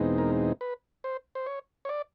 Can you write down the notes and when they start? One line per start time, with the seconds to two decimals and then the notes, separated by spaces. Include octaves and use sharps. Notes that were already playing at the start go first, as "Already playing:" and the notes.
Already playing: E2 B2 G#3 C4 D#4
0.18 A#4
0.61 B4
1.04 C5
1.35 C5
1.46 C#5
1.85 C#5
1.89 D5